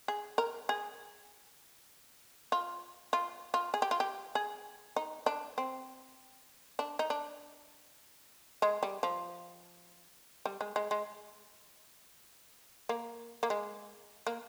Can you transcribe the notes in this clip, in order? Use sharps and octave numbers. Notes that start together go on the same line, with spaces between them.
G#4
A#4
G#4
F4
F4
F4
G#4
G4
F4
G4
G#4
D#4
D4
C4
D4
D#4
D4
G#3
G3
F3
G3
G#3
G#3
G#3
A#3
A#3
G#3
A#3